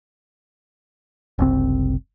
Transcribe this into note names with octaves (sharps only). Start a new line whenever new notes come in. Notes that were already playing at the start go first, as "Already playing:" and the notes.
F#1 C2 C4